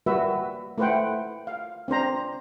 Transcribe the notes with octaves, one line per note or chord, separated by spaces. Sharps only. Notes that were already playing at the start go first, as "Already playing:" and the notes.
G3 A#3 F#4 B4 E5
A3 E4 B4 C5 F#5 G5
F5
C4 D4 C5 A#5